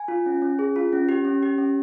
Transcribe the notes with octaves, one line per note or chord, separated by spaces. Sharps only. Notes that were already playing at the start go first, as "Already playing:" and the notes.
Already playing: G#5
F4
C#4
C#4
G#4
F4
C#4
G4
C#4
G4
C#4